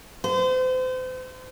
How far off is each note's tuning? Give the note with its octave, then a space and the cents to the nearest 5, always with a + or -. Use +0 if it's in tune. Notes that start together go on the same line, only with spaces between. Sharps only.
C5 -35